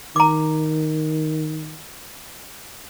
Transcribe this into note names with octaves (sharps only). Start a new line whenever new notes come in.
D#3 A#5 D6